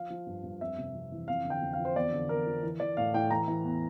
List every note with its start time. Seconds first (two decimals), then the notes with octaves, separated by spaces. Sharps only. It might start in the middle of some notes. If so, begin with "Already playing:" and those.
Already playing: F3 F5
0.10 F3
0.26 G2
0.43 G2
0.61 F2 E5
0.78 C3
0.95 F2
1.12 E3
1.28 F2 F5
1.45 D3
1.50 G5
1.62 F2
1.73 F5
1.78 F3
1.85 C5
1.96 E2 D5
2.12 D3
2.29 E2 A#4
2.46 F3
2.63 E3
2.80 E3 D5
2.97 A2 F5
3.14 A2 G5
3.31 E3 A#5
3.48 E3
3.64 E2